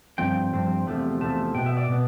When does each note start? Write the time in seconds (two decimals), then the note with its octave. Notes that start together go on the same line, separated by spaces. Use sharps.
0.18 G2 F3 C4 G5
0.53 G2 F3 C4
0.87 E2 C3 F3 A3
1.20 E2 C3 F3 A3 A5
1.54 B2 B3 G5
1.66 E5
1.77 D5
1.88 B2 B3